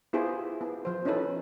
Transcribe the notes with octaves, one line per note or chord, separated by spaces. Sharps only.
B3 E4 F4 G4 G#4 C5
B3
F3 C5
C#4 D#4 E4 A4 B4